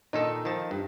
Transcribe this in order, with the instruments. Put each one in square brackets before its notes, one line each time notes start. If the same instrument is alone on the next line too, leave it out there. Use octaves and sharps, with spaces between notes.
[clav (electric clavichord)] A#2 D#3 A4 [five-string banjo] D#4
[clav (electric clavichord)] D#3 F3 A5
G2